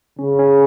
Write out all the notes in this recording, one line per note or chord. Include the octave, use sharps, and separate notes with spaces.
C#3 C#4
C#4